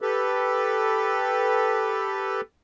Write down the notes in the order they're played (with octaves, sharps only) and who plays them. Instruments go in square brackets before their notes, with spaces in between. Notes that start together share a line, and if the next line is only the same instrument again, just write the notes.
[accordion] G4 A4 B4